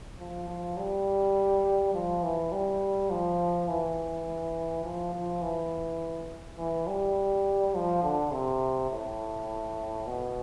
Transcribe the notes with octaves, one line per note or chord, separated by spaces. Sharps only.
F3
F3
G3
F3
E3
G3
F3
E3
F3
F3
E3
E3
G3
F3
D3
C3
A2
B2